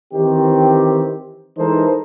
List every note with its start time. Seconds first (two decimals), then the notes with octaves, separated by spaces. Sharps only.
0.14 D#3 E3 C4 G4
1.58 E3 G#3 D#4 A4 A#4 C5